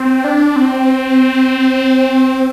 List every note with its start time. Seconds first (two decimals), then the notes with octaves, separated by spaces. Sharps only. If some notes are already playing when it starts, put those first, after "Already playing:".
Already playing: C4
0.24 D4
0.56 C4